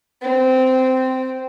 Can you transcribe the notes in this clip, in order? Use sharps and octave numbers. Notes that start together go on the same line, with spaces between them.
C4